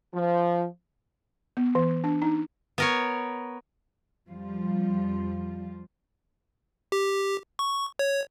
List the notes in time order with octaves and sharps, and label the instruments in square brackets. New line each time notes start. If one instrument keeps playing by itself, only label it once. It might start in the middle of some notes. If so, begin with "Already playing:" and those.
[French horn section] F3
[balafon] B3
E3
D4
D#4
[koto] B3 A#4 C#5
[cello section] F2 F3 G3 F4
[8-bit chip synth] G4
C#6
C#5